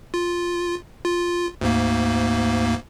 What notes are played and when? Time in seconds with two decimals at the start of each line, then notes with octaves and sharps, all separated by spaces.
0.14 F4
1.05 F4
1.61 D2 G#2 A#3